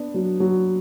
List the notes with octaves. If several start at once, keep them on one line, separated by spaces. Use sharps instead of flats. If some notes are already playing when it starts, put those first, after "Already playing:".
Already playing: B3 D4
F#3
F#3